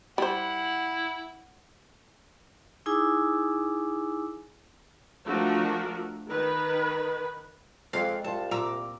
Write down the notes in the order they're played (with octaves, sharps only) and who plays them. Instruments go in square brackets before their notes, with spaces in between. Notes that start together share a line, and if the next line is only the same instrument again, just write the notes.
[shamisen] G3 C5 [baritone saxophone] E4 [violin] F#5
[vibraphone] D#4 E4 G#4 G#5 D6 E6
[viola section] F3 A3 D4 F#4 A#4
D#3 B4
[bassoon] F2 [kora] G#3 C4 D5 [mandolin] F5
[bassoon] C2 [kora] F4 A4 [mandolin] A5
[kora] A#2 [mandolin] A#5 D6 E6